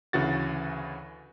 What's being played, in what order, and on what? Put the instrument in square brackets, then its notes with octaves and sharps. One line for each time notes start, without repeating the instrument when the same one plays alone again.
[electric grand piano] D2 C#3 E3 F#4 A6